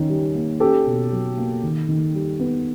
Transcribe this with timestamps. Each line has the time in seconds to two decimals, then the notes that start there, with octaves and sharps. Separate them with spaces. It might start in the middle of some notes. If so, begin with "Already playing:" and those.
Already playing: D#3 C#4
0.09 G3
0.35 A#3
0.60 C#4 G4 A4
0.87 B2
1.12 F#3
1.37 A#3
1.63 D#3
1.89 D#3
2.14 G3
2.40 B3